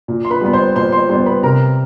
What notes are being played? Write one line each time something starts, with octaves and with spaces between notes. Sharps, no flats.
A#2
C6
B4 B5
G3 B3 B5
C5 C6
A#2 C5 C6
C5 C6
G3 B3 C5 C6
B4 B5
C3 A#4 A#5